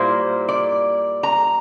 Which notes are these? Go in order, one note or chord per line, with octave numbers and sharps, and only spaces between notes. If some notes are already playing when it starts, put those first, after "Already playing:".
Already playing: A#2 G3 A#3 E4 C5
D5
A#5